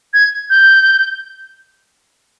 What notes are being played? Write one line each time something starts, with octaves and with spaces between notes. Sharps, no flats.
G#6
G6